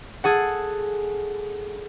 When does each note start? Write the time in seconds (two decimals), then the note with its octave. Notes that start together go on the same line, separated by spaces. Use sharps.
0.24 G#4 A4 F#5